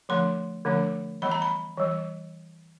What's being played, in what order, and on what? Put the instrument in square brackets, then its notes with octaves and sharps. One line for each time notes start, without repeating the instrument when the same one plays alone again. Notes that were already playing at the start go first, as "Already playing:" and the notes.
[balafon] D3 F3 A3 D4 C6
D3 F3 A3 D4
E3 G3 B3 B5
A#5
B5
E3 G3